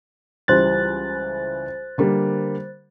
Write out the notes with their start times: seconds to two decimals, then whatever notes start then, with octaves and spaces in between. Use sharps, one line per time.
0.48 C#2 E3 G3 C5 F#6 A6
1.98 D3 G3 A#3